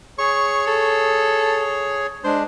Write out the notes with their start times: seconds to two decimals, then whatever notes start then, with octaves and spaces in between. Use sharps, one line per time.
0.18 G#4 C#5 C#6
0.67 A4
2.24 G#3 D4 C5